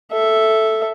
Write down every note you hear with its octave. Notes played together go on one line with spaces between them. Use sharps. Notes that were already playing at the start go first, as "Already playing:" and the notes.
A4 E5